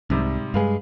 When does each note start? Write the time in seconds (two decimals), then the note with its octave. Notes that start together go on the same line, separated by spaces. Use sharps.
0.10 C2 G#2 C3 G3
0.54 G2 G#3 G#4 B4 F5